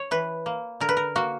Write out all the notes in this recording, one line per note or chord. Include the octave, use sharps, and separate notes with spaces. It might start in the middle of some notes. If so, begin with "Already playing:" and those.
Already playing: C#5
E3 B4
A#3
D3 A#4
B4
A#4
A#3 F#4